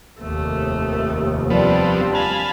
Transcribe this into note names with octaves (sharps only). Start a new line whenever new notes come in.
F1 D#2 A3
F3 G3 B3 C4 D4
F5 G#5 A5 B5